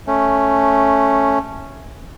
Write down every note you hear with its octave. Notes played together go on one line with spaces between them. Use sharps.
A3 C#4